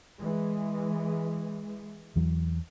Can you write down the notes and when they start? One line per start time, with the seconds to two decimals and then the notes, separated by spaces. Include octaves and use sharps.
0.20 E3 G#3
2.16 E2 E3 F#3